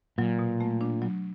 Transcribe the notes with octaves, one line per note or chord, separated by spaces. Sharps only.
A#2 F#3
B2
A3
D4
F#3